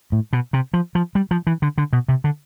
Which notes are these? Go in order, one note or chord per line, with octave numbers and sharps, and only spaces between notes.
A2
B2
C3
F3
F3
G3
F3
E3
D3
D3
B2
C3
D3